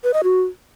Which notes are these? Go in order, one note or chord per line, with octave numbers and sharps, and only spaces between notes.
B4
D#5
F#4